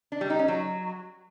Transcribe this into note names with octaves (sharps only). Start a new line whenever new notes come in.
D4
G3
D#4
C#4
F#3